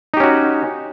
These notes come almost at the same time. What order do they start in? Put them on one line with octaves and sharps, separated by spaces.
D#4 G4 C#4 F#4